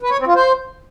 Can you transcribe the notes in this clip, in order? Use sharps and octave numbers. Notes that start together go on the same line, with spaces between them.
B4
C#5
C4
F4
C5